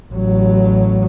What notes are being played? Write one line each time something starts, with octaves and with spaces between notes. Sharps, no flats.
A1 F#3